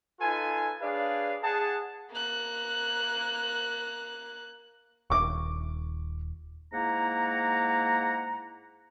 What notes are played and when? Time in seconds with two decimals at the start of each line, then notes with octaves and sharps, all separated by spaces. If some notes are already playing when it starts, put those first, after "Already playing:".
0.20 D#4 F4 A4 B4 G#5
0.80 D4 G#4 B4 C#5 D5 F5
1.43 G#4 F#5 A5
2.11 A#3 F#6
5.10 D#1 C#6 D6
6.73 G#2 A#3 E4 F#5 A#5